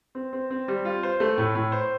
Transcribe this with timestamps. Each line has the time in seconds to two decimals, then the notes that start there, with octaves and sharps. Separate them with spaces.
0.15 C4
0.33 C4
0.51 C4
0.68 G3
0.85 F4
1.03 C5
1.20 A3
1.38 A2
1.55 A2
1.72 C5